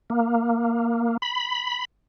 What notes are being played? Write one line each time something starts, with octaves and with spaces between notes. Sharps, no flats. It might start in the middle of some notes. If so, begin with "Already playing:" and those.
A#3
B5